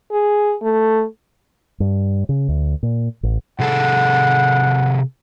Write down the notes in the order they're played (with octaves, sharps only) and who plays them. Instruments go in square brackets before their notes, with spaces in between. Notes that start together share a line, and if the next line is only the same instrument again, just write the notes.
[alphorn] G#4
A3
[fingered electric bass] G2
C#3
D2
A#2
A1
[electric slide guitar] C3 G#4 A4 [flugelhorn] F#5